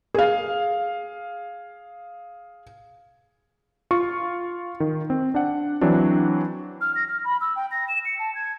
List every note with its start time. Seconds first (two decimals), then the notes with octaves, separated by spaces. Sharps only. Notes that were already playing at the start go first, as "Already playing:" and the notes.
0.14 G#4 F5
3.91 F4 C#6
4.80 D#3
5.10 C4
5.35 D4 F#5
5.81 E3 F#3 C4 D4
6.81 F6
6.96 A#6
7.08 F6
7.24 B5
7.41 E6
7.56 G5
7.71 A#6
7.88 E7
8.05 C#7
8.19 A5
8.35 G#6